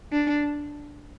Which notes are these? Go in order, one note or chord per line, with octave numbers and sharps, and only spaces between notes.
D4